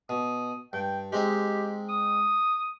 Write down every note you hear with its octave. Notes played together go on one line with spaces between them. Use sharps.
B2 D#6
G2 G5
G#3 C4 D#4 G4
D#6